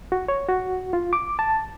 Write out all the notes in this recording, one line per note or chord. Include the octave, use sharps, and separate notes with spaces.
F#4
C#5
F#4
F4
D6
A5